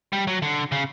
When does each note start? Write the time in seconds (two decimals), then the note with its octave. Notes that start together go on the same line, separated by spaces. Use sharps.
0.13 G3
0.27 F#3
0.42 D3
0.72 C#3